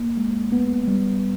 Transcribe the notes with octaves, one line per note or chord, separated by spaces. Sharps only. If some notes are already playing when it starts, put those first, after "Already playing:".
Already playing: A#3
G#3
B3
G3